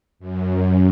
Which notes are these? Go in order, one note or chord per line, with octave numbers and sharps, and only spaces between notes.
F#2